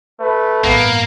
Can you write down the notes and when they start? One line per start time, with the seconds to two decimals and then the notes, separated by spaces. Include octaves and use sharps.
0.20 A3 B4
0.64 A1 G2 A#3 B3